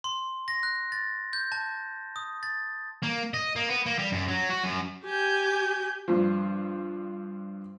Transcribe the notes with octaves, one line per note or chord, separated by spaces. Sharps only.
C6
A#6
F#6
A6
G6
A5
D#6
A6
A#3
D#5
A#3
B3
A#3
G3
F#2
F#3
F#4
F#2
G4 G#5 G6
G2 F3